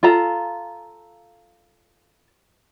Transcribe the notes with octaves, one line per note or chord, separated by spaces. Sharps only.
F4 A4 A#5